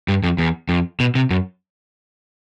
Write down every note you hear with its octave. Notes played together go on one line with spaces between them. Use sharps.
G2
F2
E2
F2
B2
C3
F#2